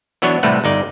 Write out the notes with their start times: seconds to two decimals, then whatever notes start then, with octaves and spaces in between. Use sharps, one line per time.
0.22 E3 F#3 B3 D4 C#5
0.43 A2 C3 G3 A3 B4 F#5
0.64 G1 D#4 D5